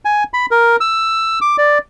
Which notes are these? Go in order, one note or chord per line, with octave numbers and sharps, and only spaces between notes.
G#5
B5
A#4
E6
D6
D5